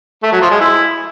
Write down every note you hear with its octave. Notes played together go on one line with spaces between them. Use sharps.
A3
F#3
F3
G#3
E4